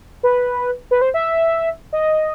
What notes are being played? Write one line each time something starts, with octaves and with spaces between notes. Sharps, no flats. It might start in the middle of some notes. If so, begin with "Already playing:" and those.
B4
B4
C5
E5
D#5